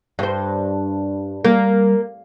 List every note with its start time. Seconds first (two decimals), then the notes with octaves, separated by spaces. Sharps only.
0.19 G2 C5
1.45 G3 A#3